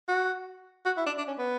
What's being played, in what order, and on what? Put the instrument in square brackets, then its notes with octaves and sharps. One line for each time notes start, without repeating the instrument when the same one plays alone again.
[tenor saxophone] F#4
F#4
E4
D4
D4
C#4
B3